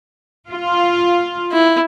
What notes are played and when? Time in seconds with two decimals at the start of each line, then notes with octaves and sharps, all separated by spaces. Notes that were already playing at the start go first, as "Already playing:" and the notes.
0.50 F4
1.52 E4